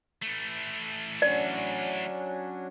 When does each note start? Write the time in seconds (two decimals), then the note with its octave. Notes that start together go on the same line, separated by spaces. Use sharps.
0.22 E3 A3
1.22 F#3 C#4 D4 D5